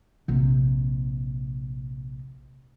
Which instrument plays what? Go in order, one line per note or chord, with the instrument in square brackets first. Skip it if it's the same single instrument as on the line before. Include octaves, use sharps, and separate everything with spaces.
[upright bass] A#1 C3